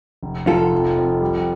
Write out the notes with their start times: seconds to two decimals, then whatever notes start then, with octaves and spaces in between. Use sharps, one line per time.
0.23 F1
0.47 F1 F4 A4
0.72 F2
0.97 F2
1.21 G3